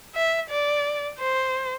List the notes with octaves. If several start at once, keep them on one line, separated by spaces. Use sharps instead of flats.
E5
D5
C5